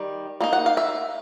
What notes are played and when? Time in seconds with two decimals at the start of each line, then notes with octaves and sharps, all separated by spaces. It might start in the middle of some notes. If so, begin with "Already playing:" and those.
Already playing: D#3 G3
0.41 G3 A#3 D#4
0.53 F#5
0.66 F5
0.77 E5